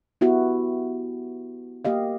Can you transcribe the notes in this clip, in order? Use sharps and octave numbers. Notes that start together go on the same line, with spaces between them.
B3 E4 F#4 G4
A#3 G4 D#5 F5